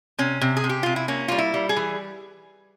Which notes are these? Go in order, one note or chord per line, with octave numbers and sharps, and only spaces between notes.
C3 C#4
C3
G#4
C3
G4
C3 F4
E4
A#3 C#4
G3 F4
E4
G3
G#4
E3